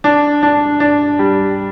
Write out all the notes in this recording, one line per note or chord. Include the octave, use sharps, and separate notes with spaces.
D4
D4
D4
G3